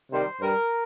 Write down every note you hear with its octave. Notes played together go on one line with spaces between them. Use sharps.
C3 D#3 G3 C5
G2 G3 A#4